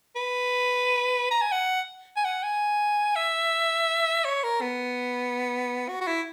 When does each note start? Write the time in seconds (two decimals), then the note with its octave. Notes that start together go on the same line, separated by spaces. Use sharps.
0.16 B4
1.31 A#5
1.42 G#5
1.52 F#5
2.17 G#5
2.25 F#5
2.43 G#5
3.16 E5
4.25 C#5
4.44 A#4
4.61 B3
5.89 F#4
6.01 F#4
6.07 E4